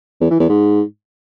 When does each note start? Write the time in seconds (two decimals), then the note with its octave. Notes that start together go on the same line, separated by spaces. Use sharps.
0.21 E2
0.31 E3
0.40 E2
0.49 G#2